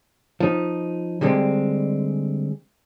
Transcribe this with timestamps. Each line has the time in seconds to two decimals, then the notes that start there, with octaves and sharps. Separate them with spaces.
0.40 F3 D#4
1.21 D3 G3 G#3 C4